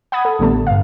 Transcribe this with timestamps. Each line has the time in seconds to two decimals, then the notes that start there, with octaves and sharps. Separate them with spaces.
0.12 F#5 B5 D#6 G#6
0.25 A4
0.39 A1 D3 G3 A3 B3 A5
0.67 G2 F5